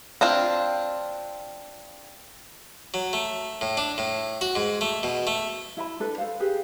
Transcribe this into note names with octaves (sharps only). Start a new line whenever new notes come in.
C4 D4 F4
F#3
A3
A2
D4
A2
F#4
G#2
A3
B2
A3
E4 E5 A#5 B5
D4 A4 B4
A4 C5 F5
G4 G#4 B4